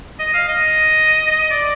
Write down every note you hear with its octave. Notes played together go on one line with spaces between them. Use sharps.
D#5
F5
D#5
D5